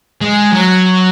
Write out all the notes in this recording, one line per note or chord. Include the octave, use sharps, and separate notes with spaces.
G#3
F#3